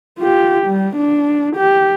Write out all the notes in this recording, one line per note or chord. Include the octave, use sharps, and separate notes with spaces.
F4 G4
G3
D4
G4